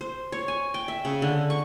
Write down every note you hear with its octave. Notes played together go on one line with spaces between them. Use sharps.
C5
C#5
G#5
G5
E5
C#3
D3
C#6